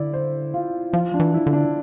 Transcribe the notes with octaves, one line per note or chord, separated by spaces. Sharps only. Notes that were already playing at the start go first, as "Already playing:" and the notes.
Already playing: D3 E4 D5
C5
F4
F3 F4
D4
E3
E4
D3
D4